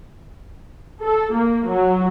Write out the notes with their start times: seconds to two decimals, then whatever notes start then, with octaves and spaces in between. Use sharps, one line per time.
1.02 A4
1.35 A#3
1.68 F#3